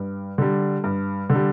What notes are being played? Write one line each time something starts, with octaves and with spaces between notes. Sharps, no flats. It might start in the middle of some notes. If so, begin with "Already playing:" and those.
Already playing: G2
D3 G3
G2
D3
G3